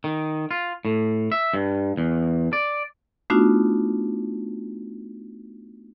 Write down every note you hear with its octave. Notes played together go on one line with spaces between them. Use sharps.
D#3
F4
A2
E5
G2
E2
D5
A3 B3 D4 D#4 F4 F#4